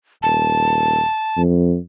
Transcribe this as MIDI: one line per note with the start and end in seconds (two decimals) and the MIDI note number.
0.23 1.02 27
0.23 1.41 81
1.37 1.77 41